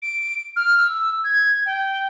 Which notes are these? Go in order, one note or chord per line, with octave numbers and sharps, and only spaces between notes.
D7
F6
E6
G#6
G5